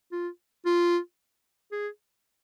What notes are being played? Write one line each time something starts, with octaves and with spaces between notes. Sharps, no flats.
F4
F4
G#4